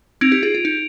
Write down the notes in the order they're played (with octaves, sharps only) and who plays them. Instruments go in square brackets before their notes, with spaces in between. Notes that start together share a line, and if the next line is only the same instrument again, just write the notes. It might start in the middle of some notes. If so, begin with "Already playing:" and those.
[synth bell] C4 D#4 [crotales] G#6 D7 F7
[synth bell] D#4 G4
F4 G#4
F4
D#4